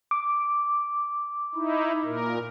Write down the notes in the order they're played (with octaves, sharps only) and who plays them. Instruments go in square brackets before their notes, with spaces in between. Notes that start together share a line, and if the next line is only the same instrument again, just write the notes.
[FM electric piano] D6
[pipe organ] D#4 E4
A#2 A#4